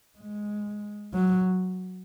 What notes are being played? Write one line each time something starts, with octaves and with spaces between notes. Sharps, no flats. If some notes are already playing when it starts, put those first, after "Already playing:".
G#3
F#3